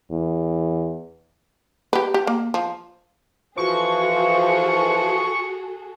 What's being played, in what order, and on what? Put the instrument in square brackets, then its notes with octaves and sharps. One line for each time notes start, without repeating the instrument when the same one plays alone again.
[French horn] E2
[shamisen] G4 B4
G4
A#3
F3
[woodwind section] E3 F3 [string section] F#4 G#4 A4 [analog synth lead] C#6